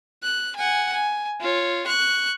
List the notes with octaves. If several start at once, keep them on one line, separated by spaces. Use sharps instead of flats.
F#6
F#5 G#5
G#5
F4 C#5
C#6 F#6